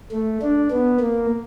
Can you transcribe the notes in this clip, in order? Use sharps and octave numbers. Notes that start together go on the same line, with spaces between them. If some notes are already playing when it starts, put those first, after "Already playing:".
A3
D4
B3
A#3